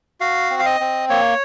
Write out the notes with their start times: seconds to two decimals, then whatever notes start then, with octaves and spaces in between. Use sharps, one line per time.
0.20 F#4 F5
0.50 C4
0.59 F5
0.66 D#5
0.80 C4
1.10 A#3 C#5